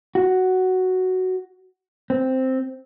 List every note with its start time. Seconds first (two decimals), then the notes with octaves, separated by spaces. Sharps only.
0.15 F#4
2.10 C4